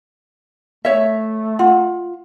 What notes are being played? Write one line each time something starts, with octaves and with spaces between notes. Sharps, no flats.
A3 C#5 E5
F4 F#5